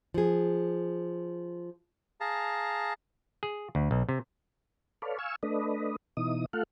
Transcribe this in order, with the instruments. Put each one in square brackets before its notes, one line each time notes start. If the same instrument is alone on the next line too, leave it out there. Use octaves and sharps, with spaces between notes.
[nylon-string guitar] F3 G#4
[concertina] G#4 F5 A5 A#5
[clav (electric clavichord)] G#4
D2
B1
C3
[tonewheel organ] A4 B4 C#5 D5 F5
F5 G#5 C#6 E6
A3 D4 B4 D#5
B2 E3 D#4 D#6
A3 F4 A4 F5 F#5